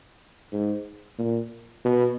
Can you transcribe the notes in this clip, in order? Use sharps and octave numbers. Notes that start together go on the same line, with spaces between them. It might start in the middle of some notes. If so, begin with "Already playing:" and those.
G#2
A#2
B2